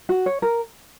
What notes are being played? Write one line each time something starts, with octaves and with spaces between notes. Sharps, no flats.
F#4
C#5
A#4